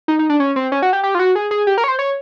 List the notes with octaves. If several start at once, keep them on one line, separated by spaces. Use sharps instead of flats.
D#4
D#4
D4
C#4
C4
C#4
F#4
G4
G4
F4
F#4
G#4
G#4
G4
A#4
C#5
C5
C#5